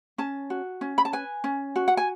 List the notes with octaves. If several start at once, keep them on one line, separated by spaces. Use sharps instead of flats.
C#4 A5
F#4
C#4
B5
A5
B4 G#5
C#4
F#4
F#5
G#5